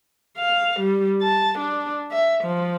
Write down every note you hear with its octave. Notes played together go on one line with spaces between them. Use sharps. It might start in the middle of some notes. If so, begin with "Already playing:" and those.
F5
G3
A5
D4
E5
F3